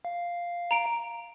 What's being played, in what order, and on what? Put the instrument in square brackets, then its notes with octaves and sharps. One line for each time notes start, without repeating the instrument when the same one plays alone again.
[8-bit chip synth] F5
[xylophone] A#5 D7